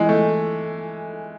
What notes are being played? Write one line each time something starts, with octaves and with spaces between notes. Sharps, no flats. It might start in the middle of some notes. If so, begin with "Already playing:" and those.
Already playing: E3 G#3
A3